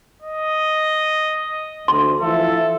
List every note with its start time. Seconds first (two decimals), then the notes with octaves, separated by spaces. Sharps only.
0.22 D#5
1.88 D2 C6
2.21 E3 F3 A4 E5